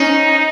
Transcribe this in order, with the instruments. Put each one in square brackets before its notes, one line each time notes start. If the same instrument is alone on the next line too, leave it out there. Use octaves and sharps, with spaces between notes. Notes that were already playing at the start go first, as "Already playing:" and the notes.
Already playing: [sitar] C#4 [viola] D#4